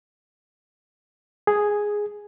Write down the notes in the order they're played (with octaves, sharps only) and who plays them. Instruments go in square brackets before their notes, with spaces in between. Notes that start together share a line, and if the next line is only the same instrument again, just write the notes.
[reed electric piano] G#4